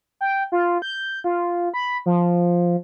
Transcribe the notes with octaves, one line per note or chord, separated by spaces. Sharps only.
G5
F4
G6
F4
B5
F3